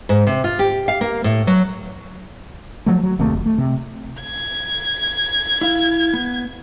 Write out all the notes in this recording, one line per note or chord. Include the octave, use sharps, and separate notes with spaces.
G#2
C3
F4
G4
F5
A#3
A2
F#3
F3 F#3 A3
F#3
D1 D#2 C3 A3
F1
A3
C3
G#6
E4 F5
B3